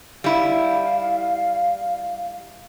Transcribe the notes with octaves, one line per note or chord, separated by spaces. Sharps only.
G3 E4 F5